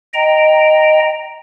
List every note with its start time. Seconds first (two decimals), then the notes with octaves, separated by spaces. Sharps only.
0.14 D#5 G5 A#5